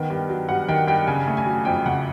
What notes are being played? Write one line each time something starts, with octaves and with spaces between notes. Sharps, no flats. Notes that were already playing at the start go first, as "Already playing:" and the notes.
Already playing: D#3 B3 G5
G2
F#3
G2 F#5
D#3 G5
G2 G5
C#3 G#5
A3
G#5
F#3
F2 G5
C#3 F#5